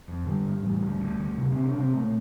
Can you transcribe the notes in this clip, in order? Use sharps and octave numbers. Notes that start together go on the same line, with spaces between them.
F2
D3 G3
G2
A1
D2
D2
D2
C3
C3 C4
D4
C3 C4
A#2 A3